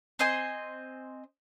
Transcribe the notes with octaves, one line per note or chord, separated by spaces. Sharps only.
C4 C5 D#5 G#5